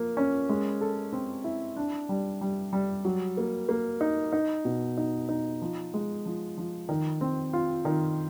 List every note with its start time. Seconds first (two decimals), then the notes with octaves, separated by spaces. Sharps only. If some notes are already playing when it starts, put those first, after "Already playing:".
Already playing: F3 A#3
0.17 C#4
0.49 G#3
0.81 A4
1.13 C4
1.44 E4
1.77 D4
2.09 G3
2.41 G3
2.73 G3
3.05 F#3
3.37 A#3
3.69 A#3
4.01 D#4
4.32 D#4
4.65 B2
4.97 D#4
5.29 D#4
5.62 F3
5.94 G#3
6.26 F3
6.58 F3
6.89 D#3
7.21 C4
7.53 F4
7.85 D#3